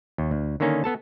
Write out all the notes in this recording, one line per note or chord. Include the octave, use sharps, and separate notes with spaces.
D#2
D2
D3 D#3 A#3 C#4 D#4
B3 A4 A5